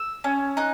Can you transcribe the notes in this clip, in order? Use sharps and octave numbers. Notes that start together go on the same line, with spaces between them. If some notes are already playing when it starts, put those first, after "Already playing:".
Already playing: E6
C#4
D#4 F#6